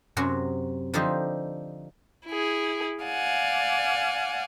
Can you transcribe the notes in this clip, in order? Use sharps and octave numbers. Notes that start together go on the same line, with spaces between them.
F#2 C3 F#3 F#4
D3 F3 D#4 G4 C5
E4 G#4
D5 F5 F#5 G#5